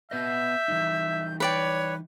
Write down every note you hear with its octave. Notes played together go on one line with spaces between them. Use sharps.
B3 B4 D#5 E5 G6
E3 G3 D#4
B4 C#5 D5 G5